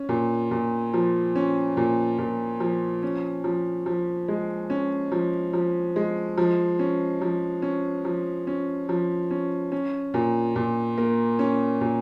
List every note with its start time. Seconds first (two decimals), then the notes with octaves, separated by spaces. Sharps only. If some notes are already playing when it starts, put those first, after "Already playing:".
Already playing: C#4
0.09 A#2
0.51 A#2
0.94 F3
1.36 C#4
1.77 A#2
2.19 A#2
2.60 F3
3.03 C#4
3.44 F3
3.86 F3
4.28 G#3
4.70 C#4
5.12 F3
5.53 F3
5.96 G#3
6.38 F3
6.79 C#4
7.21 F3
7.62 C#4
8.05 F3
8.47 C#4
8.89 F3
9.31 C#4
9.72 C#4
10.14 A#2
10.56 A#2
10.98 A#3
11.39 C#4
11.81 A#2